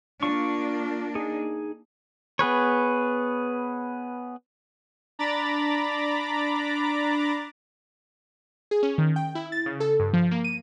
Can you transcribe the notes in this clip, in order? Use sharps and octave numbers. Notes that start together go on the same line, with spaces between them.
A#3 D4 F4 C#6
D#4 G#4
B3 G#4 B4 C#5
D4 A#5 B5 D6 A6
G#4
C#4
D#3
G5
E4
A6
C#3
A4
G2
F3
A#3
D#7